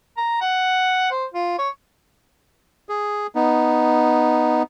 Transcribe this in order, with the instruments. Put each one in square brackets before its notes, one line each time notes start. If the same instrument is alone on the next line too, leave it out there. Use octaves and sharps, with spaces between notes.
[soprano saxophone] A#5
F#5
C5
F4
C#5
[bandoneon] G#4
B3 D#4